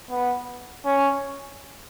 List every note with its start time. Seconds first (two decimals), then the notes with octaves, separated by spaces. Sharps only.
0.10 B3
0.86 C#4